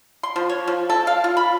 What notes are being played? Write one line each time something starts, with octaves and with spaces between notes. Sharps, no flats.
C6
F3
C#5
F3
A4
F5
F4
B5